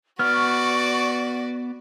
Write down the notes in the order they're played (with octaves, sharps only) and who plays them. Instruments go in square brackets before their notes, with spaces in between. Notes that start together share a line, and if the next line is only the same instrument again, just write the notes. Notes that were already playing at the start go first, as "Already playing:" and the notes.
[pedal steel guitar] B3 [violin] F#4 D5 [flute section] C#6 [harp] F6